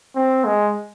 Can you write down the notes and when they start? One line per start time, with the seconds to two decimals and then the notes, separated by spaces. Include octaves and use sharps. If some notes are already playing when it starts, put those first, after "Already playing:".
0.16 C4
0.45 G#3